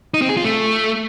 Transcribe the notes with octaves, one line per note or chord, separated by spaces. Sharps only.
D#4
C4
G#4
F4
A3